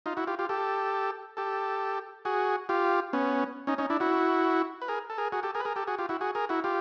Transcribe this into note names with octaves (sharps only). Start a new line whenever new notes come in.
D#4 F4
E4 F#4
F4 G4
F4 G4
G4 A4
G4 A4
F#4 G#4
F4 G4
B3 C#4
C#4 D#4
C#4 D#4
D4 E4
E4 F#4
B4
G#4 A#4
A4
G#4 A#4
F#4 G#4
G4 A4
G#4 A#4
B4
G#4 A#4
G4 A4
F#4 G#4
F4 G4
E4 F#4
F#4 G#4
G#4 A#4
E4 F#4
F4 G4